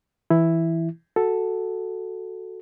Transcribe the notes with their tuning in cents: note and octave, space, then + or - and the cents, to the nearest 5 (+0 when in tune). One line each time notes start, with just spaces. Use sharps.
E3 +0 E4 +0
F#4 +0 A4 +0